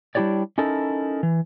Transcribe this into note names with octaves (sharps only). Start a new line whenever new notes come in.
G3 D4 E4 G4 C#5 D5
C#4 D#4 E4 A4 A#4
E3